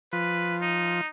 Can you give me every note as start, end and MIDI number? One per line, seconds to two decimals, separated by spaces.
0.13 1.01 53
0.13 0.57 71
0.62 1.08 63